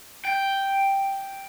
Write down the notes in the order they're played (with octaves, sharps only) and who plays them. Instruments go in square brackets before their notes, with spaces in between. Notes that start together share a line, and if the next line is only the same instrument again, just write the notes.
[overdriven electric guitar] G5